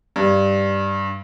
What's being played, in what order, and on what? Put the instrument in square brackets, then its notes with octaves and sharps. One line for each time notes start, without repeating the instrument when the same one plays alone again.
[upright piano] G2